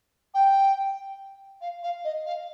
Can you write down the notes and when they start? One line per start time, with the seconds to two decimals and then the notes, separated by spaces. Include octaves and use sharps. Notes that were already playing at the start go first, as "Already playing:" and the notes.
0.34 G5
1.61 F5
1.83 F5
2.04 D#5
2.26 F5